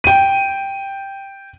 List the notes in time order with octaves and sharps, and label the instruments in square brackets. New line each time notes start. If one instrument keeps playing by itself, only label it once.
[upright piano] G5 D#7